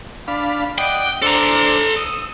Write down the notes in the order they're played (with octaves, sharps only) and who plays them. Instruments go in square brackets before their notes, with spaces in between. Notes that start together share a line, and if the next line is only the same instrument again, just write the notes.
[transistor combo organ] D4 F5 B5
[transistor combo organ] D5 D#5 F#5 [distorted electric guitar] G5
[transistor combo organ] D4 C5 [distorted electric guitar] A4 A#5
[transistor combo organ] D#6 E6